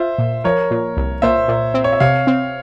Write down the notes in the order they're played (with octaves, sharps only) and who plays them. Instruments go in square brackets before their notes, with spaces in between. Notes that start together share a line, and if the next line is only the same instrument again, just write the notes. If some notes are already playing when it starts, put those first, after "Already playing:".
Already playing: [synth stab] F4 [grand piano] C5 E5
[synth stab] A#2
[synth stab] F3 [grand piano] A#4 C#5
[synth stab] A#2
C2
[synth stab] A#2 [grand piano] C5 E5
[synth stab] A#2
C4
[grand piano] C#5
E5
[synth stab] C3 [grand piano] C#5 F5
[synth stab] C4